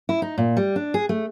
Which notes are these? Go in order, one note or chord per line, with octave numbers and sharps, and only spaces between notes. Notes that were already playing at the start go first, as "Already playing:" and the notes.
E4
D#4
A#2
G3
D4
G#4
A3